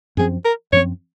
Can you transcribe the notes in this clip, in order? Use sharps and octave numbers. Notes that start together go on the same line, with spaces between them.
F#2 F3 C4 G#4
A#4
F#2 F3 C4 C#5